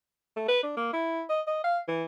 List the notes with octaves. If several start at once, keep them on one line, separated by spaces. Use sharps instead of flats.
A3
B4
D4
A#3
E4
D#5
D#5
F5
E3